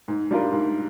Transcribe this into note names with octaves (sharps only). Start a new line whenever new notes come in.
G#2
G3 D4 F4 A#4
G#2